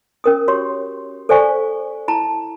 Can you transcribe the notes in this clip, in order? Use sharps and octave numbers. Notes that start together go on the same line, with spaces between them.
C#4 A#4 D#6
F#4 G4 C#5 C6
A4 C5 D5 F5 G#5 C#6
E4 A5 A#5